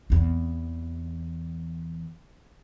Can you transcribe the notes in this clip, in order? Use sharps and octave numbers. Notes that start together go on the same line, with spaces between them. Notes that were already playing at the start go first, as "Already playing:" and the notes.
E2 C4